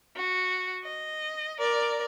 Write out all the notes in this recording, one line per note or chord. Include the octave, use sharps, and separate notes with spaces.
F#4
D#5
A#4 D5